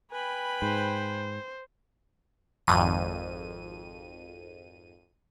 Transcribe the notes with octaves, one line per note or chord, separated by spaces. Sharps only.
B4 G5 G#5 B5
G#2 C5
G#1 F2 D#7